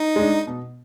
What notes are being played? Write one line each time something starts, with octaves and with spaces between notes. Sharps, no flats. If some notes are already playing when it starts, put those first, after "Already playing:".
Already playing: D#4
G#3 D4
B2